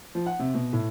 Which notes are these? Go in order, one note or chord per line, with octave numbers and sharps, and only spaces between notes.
F3
F#5
C3
B2
A2